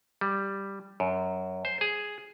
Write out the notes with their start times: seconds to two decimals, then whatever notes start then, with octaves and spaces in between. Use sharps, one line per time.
0.21 G3
1.00 F#2
1.65 C5
1.81 G#4